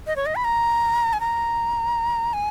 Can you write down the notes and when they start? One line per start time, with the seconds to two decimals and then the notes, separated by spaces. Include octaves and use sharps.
0.07 D#5
0.16 C#5
0.26 D#5
0.35 B5
0.44 A#5
1.13 G#5
1.20 A#5
2.33 G#5